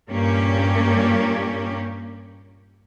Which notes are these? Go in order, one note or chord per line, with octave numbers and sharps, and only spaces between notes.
G2 A#2 A#3 C#4 G4